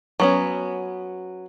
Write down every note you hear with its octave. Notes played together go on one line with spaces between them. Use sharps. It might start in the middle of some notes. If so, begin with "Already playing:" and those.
F#3 B3 C#4